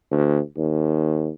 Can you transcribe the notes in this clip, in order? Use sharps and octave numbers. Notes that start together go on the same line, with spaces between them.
D2
D#2